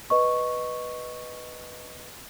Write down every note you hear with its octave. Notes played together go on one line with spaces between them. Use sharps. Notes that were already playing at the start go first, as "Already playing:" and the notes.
B4 D#5 C#6